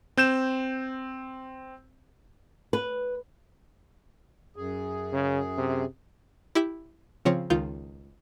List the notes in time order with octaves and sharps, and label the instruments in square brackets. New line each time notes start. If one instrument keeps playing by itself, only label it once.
[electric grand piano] C4 G6 E7
[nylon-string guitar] B4
[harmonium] F#2 G#4
[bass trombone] C#3
C3
[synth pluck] E4 G4 E5 B6
C#3 F3 C4 C#5
C#2 D#3 F4 F5 G6